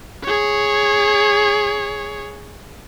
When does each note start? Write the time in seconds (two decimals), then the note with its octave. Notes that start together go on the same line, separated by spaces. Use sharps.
0.24 G#4 C#5